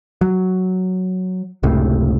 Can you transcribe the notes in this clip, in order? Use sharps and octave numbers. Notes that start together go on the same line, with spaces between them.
F#3
F#1 C#2 A2 C3